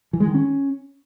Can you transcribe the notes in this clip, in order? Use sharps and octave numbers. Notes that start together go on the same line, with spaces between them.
E3
G#3
D#3
C#4